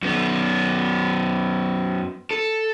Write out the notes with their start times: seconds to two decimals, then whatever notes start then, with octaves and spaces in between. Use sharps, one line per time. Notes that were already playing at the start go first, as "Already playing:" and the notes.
0.03 F#2 B3
2.31 A4